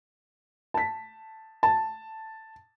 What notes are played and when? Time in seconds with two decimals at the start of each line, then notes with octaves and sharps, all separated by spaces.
0.74 A5 B6
1.63 A5